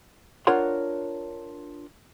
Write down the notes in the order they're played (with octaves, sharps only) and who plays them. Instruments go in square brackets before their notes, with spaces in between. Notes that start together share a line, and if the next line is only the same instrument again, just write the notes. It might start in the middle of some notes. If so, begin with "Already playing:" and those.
[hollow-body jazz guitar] D4 F4 A#4 C#5 F#5 C6